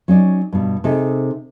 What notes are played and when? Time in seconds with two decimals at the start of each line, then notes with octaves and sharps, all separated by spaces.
0.08 F#3 C#4 D#4 D5
0.53 G2 B2
0.84 C3 D#4 G#4 A4